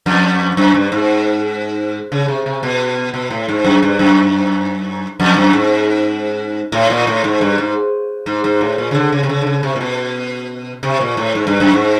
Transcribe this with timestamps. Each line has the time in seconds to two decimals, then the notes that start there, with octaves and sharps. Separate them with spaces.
0.06 F2
0.57 F#2
0.74 G2
0.92 G#2
2.12 C#3
2.28 C3
2.46 C3
2.63 B2
3.14 B2
3.30 A2
3.48 G#2
3.64 F#2
3.82 G2
3.99 F#2
5.20 F2
5.37 F#2
5.53 G#2
6.72 A2
6.90 A#2
7.07 A2
7.24 G#2
7.41 G2
7.58 G#2
8.26 G#2
8.44 G#2
8.61 A2
8.78 A#2
8.91 C#3
8.95 D3
9.12 C#3
9.23 C3
9.29 C#3
9.41 D3
9.47 C#3
9.63 C3
9.76 A#2
9.81 B2
10.83 C3
11.01 A#2
11.17 A2
11.35 G#2
11.47 G2
11.60 F#2
11.73 G#2